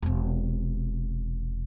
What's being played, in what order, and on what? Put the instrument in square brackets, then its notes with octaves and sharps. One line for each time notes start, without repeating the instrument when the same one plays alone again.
[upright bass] E1 C3